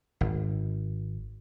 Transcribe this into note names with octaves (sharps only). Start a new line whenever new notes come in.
G#1